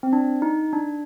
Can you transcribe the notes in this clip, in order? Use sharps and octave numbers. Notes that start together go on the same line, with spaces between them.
C4
D4
D#4
D4